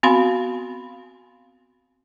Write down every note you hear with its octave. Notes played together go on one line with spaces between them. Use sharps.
B3 C4 F#4 F5 B5 C6